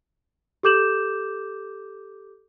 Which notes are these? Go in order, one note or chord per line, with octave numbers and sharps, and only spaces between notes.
G4 A4 D6 G6 E7 F#7